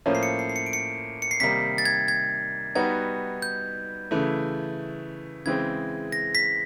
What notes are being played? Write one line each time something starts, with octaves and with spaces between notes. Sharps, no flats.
A2 F3 A#3 C#4
C7
C#7
C7
C7
C#7
D7
C#7
C#7
C7
C3 D#3 G3 A#3 D#4 B6
A6
G#6
G#6
G3 B3 D#4 F#4 G#6
G6
C#3 E3 A3
C#3 E3 G#3 C4 G#6
A#6
B6